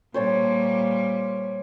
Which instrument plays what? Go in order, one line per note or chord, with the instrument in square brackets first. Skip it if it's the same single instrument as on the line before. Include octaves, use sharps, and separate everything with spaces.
[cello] A#2 G3 [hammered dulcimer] C5 C#5 A5